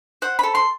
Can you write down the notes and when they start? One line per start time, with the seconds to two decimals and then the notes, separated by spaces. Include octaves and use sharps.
0.22 C5 F#5
0.39 A4 B5
0.55 C6